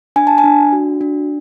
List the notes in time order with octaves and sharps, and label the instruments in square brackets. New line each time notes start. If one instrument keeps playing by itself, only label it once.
[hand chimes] D4 G#5
A5
G#5
D4
F#4
D4